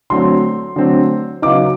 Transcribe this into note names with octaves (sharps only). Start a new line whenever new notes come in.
D3 F#3 A3 C4 C6
D3 F#3 A3 C4
C#3 F#3 B3 D#4 D6